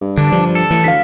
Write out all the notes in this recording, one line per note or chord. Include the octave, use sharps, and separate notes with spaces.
G2
D3 D4
G2 F3
A4
A2 E3
D2 F5 B6